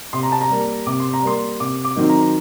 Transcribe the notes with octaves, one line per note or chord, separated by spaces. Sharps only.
C3 C6
A#5
A5
A#5
G3 A#3
C3 D6
C6
A#5
G3 A#3 C6
C3 D6
D6
D#3 F#3 C4 D#4
A#5